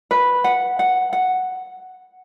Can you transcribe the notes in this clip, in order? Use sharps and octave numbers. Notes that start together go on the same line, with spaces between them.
B4
F#5
F#5
F#5